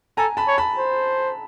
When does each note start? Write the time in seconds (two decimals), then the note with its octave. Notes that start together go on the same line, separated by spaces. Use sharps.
0.17 A4 G#5 A#5
0.37 A5 B5
0.48 C#5
0.58 A5 B5
0.78 C5